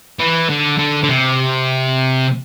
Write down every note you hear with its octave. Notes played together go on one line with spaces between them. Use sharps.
E3
D3
D3
D3
C3